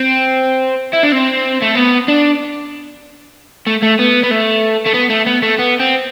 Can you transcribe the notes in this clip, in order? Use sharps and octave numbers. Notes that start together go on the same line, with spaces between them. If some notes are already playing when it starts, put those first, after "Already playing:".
Already playing: C4
E4
D4
C4
A3
B3
D4
A3
A3
B3
B3
A3
A3
B3
A3
B3
A3
B3
C4